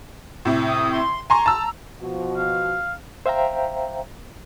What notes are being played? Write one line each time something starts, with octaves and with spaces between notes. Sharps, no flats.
A2 C3
D#6
C6
G#5 A#5 C6 C#6
A5 E6
B2 F3 F#4
F5
C5 E5 F5 G5 A#5